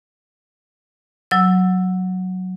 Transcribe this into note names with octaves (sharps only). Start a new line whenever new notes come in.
F#3 E6